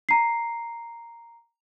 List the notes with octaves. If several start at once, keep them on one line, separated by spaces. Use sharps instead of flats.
A#5 C7